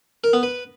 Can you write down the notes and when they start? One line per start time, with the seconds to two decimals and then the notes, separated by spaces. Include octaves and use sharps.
0.24 A#4
0.33 B3
0.43 B4